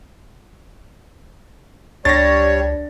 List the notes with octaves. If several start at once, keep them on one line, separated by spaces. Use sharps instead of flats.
C#2 G3 D4 C#5 A6 A#6